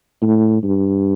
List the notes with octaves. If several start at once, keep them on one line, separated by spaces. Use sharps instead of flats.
A2
G2